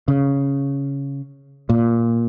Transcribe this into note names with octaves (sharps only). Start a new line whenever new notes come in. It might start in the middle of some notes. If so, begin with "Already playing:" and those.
C#3
A#2